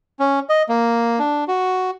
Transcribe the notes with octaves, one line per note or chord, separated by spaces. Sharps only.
C#4
D#5
A#3
D4
F#4